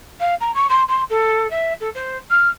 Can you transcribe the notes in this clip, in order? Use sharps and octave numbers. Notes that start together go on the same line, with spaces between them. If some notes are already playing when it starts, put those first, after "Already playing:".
F5
A#5
C#6
C6
C6
A4
E5
A4
C5
F6